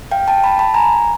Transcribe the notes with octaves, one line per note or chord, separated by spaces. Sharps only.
F5 G5
G5 A5
A5 B5
A5 B5
G#5 A#5